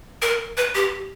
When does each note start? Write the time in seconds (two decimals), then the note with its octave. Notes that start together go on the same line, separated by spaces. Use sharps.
0.22 A#4
0.57 B4
0.75 G4